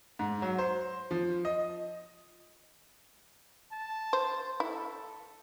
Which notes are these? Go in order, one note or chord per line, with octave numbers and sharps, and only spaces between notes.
G#2
F#3
C5
F3
D#5
A5
C5
E4 A4